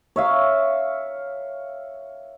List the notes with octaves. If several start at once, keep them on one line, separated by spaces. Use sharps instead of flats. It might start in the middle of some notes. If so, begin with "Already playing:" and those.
C#5 E5 F5